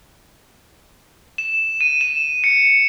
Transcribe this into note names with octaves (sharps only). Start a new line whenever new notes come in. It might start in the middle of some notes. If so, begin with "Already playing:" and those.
E7
D#7
E7
C#7